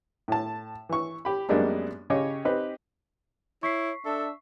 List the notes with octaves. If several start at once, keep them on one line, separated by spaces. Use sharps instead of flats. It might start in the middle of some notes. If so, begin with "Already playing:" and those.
A2 A5
E3 C#6
G4 B5
F#2 G3 G#3 A#3 B3 D4
C#3 G4 C#5 D#5 D6
C4 D#4 G4 B4
E4 C#5 C#6 B6 C7
D4 A4 E5